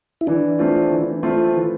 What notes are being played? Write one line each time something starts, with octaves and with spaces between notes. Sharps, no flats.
E4
E3 D4
A3 C4 F4
E3
A3 C4 F4
E3